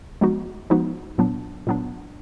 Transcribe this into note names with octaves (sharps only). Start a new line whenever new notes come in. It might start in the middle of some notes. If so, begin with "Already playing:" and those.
F3 G#3 B3 D#4 F#4
F3 G#3 B3 D#4 F#4
A#2 F#3 B3 D4
A#2 F#3 B3 D4